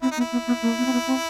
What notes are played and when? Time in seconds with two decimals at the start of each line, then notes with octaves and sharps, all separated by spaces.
0.02 C4 E4
0.11 D#4
0.17 B3
0.21 E4
0.32 B3
0.47 B3
0.62 A#3
0.78 B3
0.86 C4
0.93 B3
1.07 C4